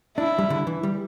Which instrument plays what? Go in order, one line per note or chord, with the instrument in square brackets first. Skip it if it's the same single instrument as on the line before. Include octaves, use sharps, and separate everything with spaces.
[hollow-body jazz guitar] D4 [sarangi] E4
[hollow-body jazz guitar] G3
D3
E3
G3